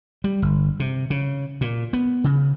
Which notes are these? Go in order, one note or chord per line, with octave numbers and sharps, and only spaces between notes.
G3
G1
C3
C#3
A#2
B3
C#3